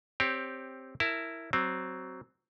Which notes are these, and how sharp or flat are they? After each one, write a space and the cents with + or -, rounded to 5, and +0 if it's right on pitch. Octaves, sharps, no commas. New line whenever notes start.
C4 +5 G4 +0 C#5 +20
E4 +0 A#4 -15 A5 +0
F#3 +15 C4 +0